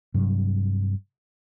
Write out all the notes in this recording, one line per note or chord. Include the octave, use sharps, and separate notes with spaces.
G2 C3 F#3